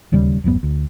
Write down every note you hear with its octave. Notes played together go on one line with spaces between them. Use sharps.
D1 D#2 C#3 G3
D1 A1 F#2 B3
D2